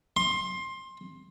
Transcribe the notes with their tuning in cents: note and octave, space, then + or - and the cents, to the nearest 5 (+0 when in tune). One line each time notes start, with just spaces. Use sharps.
C6 +20